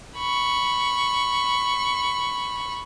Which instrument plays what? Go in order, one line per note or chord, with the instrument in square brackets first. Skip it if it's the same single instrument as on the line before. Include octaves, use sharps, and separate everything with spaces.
[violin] B5 C#6